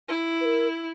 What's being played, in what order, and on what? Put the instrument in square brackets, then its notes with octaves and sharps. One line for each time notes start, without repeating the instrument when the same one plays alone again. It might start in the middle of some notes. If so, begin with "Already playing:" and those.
[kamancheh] E4
[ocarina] B4
A#4